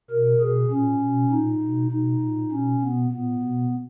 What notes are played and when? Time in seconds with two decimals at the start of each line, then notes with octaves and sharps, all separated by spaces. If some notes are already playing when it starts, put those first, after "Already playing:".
0.10 B2 A#4
0.40 B2 G#4
0.71 A#2 C#4
1.01 B2
1.31 A#2 D#4
1.62 B2
1.91 B2 D#4
2.21 A#2
2.51 B2 C#4
2.81 B2 B3
3.11 A#2 B3
3.42 B2